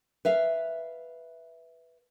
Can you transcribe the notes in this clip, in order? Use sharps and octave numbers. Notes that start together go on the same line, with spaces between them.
B4 E5 F5